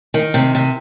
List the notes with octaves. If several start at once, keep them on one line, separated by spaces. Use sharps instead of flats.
D#3
C3
C3